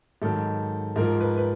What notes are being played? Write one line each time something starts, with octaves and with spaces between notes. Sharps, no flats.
G#2 D#3 F#3 A4
G#2 F3 A#4
B4
B4